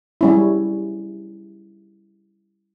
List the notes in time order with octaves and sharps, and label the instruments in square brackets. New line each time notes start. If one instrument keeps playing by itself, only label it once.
[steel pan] G3 C#4 E4